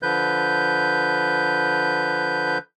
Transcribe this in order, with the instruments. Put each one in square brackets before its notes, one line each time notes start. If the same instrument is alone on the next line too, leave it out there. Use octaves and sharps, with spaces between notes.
[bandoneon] D3 F3 B4 G6